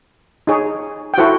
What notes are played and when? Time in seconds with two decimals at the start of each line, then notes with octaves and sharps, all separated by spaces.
0.47 D#4 G#4 C#5
1.14 G5
1.18 E4 F#4 A4 C5 F#5